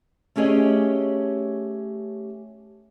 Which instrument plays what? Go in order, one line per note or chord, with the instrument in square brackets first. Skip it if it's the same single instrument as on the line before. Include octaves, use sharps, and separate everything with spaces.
[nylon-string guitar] A3 C#4 G4 G#4 C#5 D#5